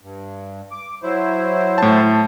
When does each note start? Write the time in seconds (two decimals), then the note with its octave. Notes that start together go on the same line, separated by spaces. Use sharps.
0.01 G2
0.71 D6
1.03 F#3 E4 C5
1.78 A2 A5